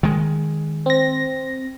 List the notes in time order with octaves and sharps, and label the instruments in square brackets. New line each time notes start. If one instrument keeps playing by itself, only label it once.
[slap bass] D#3 G#3
[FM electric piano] C4 A#6